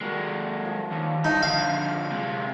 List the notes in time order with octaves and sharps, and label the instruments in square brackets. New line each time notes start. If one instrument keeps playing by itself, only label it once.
[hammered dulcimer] G3 F4 F#4 [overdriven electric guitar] G#3 A#3
[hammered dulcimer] F3
[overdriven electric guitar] D#2 [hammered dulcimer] C#5 D5
[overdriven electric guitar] G2 A5 [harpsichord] D#4
[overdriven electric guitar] D3 F3 [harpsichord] F5
[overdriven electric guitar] C3 G#3